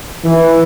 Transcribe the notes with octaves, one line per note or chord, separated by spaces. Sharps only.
E3